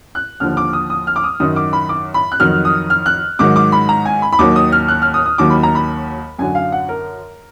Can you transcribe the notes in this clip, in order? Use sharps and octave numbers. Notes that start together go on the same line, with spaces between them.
F#6
D#2 D3 F3 F6
D6
D#6
D#6
F6
D6
D#6
F#2 D#3 F#3 D#6
D6
B5
D6
B5
F#6
F2 D#3 F#3 F6
D#6
F6
F#6
G#2 D#3 F#3 D6
D6
B5
A#5
G#5
B5
B5
D#2 D#3 F#3 D6
D#6
F6
F#6
F6
D#6
D#6
D#2 D#3 F#3 D6
B5
A#5
B5
F#2 D3 F#3 G#5
F5
F#5
A#4